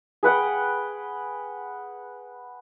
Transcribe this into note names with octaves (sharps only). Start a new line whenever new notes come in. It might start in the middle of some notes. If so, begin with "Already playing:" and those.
G#4 B4 F#5 G5